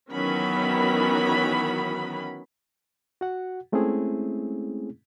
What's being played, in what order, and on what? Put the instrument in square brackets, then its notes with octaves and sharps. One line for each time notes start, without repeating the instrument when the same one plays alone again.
[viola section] D#3 E3 F#3 B3 C#4 B5
[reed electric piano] F#4 F#5
G#3 A3 C4 C#4 E4 G#4